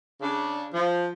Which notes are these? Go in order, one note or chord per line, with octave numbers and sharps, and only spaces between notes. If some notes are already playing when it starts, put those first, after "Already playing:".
C#3 D4
F3